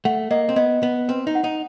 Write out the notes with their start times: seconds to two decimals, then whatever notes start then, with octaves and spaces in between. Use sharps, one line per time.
0.05 A3 F#5
0.31 A#3 D#5
0.49 C4
0.56 B3 D#5
0.83 B3 D#5
1.09 C4 B4
1.27 D#4
1.35 F#5
1.44 D#4